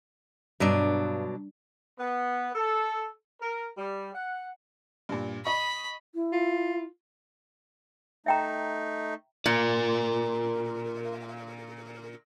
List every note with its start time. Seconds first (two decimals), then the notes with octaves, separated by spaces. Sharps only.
0.60 G2 B2 F#3 D4
1.99 B3
2.54 A4
3.40 A#4
3.76 G3
4.14 F#5
5.09 G2 A#2
5.45 D#5 B5 C#6
6.15 E4
6.32 F4
8.26 A3 D#4 E5 G5 A#5
9.46 A#2 A#4 D5